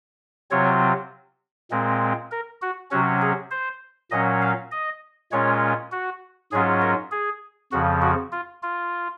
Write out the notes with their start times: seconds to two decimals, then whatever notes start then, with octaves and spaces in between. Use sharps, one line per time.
0.51 C3 F#3 C4 F4 C#5
1.71 A#2 G#3 C4
2.31 A#4
2.62 F#4
2.91 C3 F#3 C#4 F#4
3.21 G#4
3.51 C5
4.11 A#2 F#3 C#4 D#5
4.42 F5
4.71 D#5
5.32 A#2 G#3 C#4 F4 C#5
5.92 F#4
6.52 G#2 F#3 C#4 F4 G#4
6.81 A#4
7.11 G#4
7.72 F2 C#3 F3 F#4
8.02 F#4
8.32 F4
8.63 F4